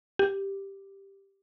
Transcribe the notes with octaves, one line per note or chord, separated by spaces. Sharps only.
G4